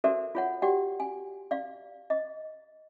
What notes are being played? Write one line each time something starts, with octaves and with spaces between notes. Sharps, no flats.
F#4 A4 A#4 C5 D5 E5
F4 C#5 F#5
F#4 G4 D5 F#5 G5
G#5
D5 F5
D#5